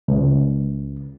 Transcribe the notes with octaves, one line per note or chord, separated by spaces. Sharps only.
C#2